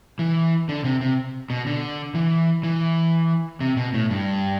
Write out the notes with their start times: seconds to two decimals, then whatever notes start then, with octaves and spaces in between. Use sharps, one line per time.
0.19 E3
0.69 D3
0.84 C3
1.01 C3
1.50 B2
1.67 D3
2.15 E3
2.63 E3
3.60 C3
3.77 B2
3.94 A2
4.10 G2